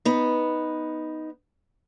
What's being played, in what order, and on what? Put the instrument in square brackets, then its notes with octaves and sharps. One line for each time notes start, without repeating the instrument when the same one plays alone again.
[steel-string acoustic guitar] B3 D#4